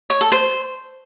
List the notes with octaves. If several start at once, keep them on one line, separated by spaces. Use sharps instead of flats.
C#5
A4
C5